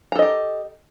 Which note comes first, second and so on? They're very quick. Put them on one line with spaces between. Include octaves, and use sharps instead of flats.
A#5 A4 D#5 G4